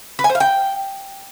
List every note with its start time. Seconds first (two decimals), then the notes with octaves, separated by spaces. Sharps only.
0.19 B4
0.24 G#5
0.30 C5
0.35 F5
0.40 G5